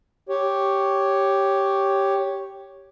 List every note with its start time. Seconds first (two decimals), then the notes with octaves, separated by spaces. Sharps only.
0.29 G4 C#5